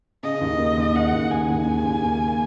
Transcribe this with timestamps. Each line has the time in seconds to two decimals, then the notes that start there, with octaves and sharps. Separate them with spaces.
0.23 C#3 D#5
0.41 D#2
0.59 A#3
0.77 D#2
0.95 C#3 F#5
1.13 D#2
1.31 A#3 G#5
1.49 D#2
1.68 C#3
1.85 D#2
2.04 A#3